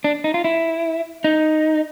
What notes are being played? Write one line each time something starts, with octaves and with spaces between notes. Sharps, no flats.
D4
D#4
F4
E4
D#4